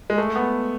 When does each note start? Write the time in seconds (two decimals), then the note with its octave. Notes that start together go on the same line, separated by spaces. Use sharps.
0.10 G#3
0.18 A3
0.36 B3